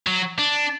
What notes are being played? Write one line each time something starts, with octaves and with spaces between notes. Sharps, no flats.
F#3
D4